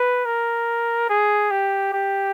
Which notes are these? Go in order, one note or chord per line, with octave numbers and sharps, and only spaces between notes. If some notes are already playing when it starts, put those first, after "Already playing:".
Already playing: B4
A#4
G#4
G4
G4